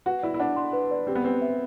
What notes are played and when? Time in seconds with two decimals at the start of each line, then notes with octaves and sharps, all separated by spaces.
0.06 F#4 B4
0.23 E4 D5
0.34 E4
0.40 D4 F#5
0.56 C6
0.73 B4
0.91 D5
1.07 C4 G4
1.15 B3
1.24 C4 B4
1.41 E5